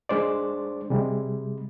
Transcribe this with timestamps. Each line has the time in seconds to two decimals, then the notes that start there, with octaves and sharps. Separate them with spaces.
0.09 G#3 D4 C5 D5
0.90 C3 G3 G#3